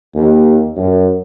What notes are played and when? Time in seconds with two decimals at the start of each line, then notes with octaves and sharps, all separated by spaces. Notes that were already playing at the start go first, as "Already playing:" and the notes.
0.16 D#2
0.77 F#2